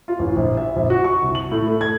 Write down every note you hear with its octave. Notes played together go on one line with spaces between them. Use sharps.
F4
A1
A#1
E5
A#1
F#4
C#6
C2
F#7
A2
A3
G#6